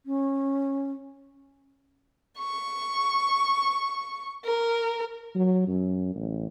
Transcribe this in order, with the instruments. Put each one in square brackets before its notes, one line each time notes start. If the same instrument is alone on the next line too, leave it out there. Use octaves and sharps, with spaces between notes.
[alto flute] C#4
[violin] C#6
A#4
[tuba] F#3
F#2
A1